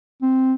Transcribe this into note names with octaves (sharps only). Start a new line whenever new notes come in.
C4